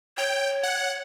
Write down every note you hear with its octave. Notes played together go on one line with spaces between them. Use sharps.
C#5 G5
F#5